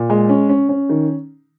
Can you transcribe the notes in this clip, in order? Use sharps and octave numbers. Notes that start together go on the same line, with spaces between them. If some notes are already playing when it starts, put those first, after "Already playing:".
Already playing: A#2
G#3
C#4
C#4
C#4
D#3